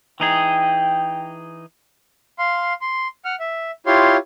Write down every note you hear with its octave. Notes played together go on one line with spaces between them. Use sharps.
E3 D#4 G#4 G5
F5 C6
C6
F#5 F6
E5
E4 F4 G4 C#5 F5 C6